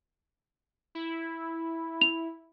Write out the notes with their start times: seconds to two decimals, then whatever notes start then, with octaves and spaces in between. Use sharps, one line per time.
0.95 E4
2.01 F7